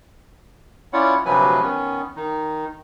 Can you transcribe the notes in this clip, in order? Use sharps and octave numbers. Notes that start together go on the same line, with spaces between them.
C#4 E4 F4 C#5 D5 F#5
D2 C3 F3 F#3 B4 G#5
D#3 B3 C#4
D#3 D#4